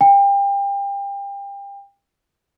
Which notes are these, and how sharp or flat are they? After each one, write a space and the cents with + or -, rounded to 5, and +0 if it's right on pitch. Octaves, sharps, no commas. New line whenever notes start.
G5 +30